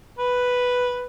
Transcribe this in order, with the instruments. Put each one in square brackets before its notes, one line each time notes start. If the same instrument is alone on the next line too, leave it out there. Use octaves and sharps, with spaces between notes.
[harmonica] B4